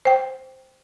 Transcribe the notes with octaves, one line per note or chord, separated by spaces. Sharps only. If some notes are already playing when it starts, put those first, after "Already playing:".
C5 G5